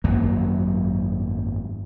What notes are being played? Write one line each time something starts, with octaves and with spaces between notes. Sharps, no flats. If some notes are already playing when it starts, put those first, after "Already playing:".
G#1 F#2 F#3 A#3